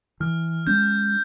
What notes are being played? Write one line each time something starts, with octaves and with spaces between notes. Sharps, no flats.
E3 F6
G#3 C#4 G6